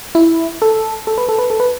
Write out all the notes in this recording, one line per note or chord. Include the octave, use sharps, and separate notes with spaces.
E4
A4
A4
B4
A4
B4
A4
B4